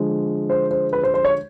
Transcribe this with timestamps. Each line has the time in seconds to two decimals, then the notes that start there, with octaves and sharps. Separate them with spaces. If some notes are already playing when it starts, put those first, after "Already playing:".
Already playing: D3 F3 G#3
0.50 C5
0.71 C5
0.93 B4
1.03 C5
1.14 C5
1.24 C#5